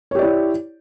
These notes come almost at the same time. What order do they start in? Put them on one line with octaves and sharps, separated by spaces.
C#5 G4 D5 E4